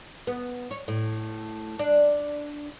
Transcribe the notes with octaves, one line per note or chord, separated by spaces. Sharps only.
B3
C#5
A2
D4